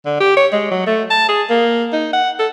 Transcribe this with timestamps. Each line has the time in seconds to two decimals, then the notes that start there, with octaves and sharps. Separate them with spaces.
0.06 D3
0.20 G4
0.37 C#5
0.52 G#3
0.71 F#3
0.87 A3
1.11 A5
1.29 G#4
1.50 A#3
1.93 D#4
2.13 F#5
2.39 A4